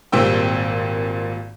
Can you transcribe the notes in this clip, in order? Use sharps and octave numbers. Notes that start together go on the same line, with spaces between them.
G#1 A#2 G3 C4 G5 E6